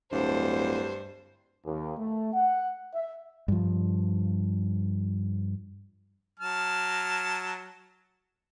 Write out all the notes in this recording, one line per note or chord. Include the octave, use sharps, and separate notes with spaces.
D1 G2 C5
D#2
A3
F#5
E5
G2 F3
F#3 A5 F6